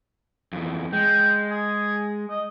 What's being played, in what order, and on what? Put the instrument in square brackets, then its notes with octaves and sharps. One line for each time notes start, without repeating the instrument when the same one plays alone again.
[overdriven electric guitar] F2 E3
[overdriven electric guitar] G#3 [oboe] G5
[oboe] G#4
D#5